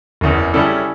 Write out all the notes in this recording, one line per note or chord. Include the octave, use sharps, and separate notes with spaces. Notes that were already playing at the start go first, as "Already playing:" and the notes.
F#1 E2 C#3
C#3 G3 C#4 E4 A4